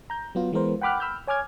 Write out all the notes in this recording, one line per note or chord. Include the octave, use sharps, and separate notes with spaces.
A#5 G6
F#3 B3 F4
E3 G#3 B3 A#4 C5
F#5 G5 B5 D6 F6 F#6
B5 E6 F6 G6
C#5 G#5 D6 F6 G#6